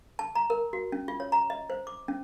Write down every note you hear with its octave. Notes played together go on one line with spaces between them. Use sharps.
A5
A#5
A#4
F#4
C#4
F4
C#5
A#5
D#5
C5
D6
C#4